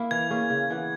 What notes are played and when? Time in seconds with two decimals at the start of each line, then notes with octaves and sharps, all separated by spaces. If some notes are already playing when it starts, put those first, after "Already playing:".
Already playing: A#3 E4
0.11 E3 G#6
0.30 A#3 C#4 G#4
0.50 C#3
0.70 E3 B3